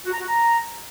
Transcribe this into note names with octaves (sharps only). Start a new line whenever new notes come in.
F#4
A#5
F#4
A#5